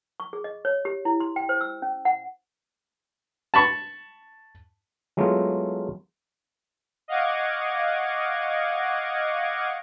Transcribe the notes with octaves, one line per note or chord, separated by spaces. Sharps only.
C#6
G#4
D#5
C#5
G4
E4
C6
G5
C5
E6
C#4
F#5
A5 B5 C#6
F#3 G#3 A3 B3 E4 F4
D#5 F5 F#5 C#6 D6 G#6